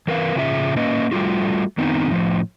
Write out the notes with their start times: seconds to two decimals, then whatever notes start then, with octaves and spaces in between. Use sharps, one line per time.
0.07 E3 A#4 B4 F5
0.36 A#2 C#3 C#4 F4 G#4 E5
0.76 A#3 C#4 B4 D#5
1.12 G3 A3 F4 F#4
1.78 D#3 B3 C4 D#4
2.11 A2 F3